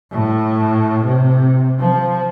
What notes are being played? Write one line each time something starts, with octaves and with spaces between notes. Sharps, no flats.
A2
C3
F3